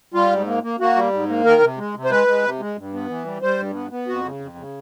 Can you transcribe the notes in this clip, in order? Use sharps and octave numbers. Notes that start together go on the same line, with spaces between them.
G3 F4
G#2
A#3
A#3
A#3 F#4
G3
G#2
A#3
D#3 A#4
C3
G#3
C3
C5
G#3 B4
G#3
C3
G#3
G2
B3
E3
G3
G3 C5
G2
B3
B3
F2 F#4
C#3
F2
C#3